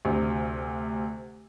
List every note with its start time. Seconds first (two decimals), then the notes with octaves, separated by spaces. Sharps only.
0.05 D2 C3